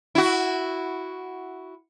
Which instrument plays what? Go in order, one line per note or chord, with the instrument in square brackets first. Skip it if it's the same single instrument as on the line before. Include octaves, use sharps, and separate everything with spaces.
[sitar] E4 F#4